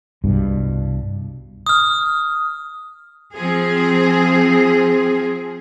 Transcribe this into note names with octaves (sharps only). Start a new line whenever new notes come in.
C2 G2 B2
D#6 F6
F3 C4 G#4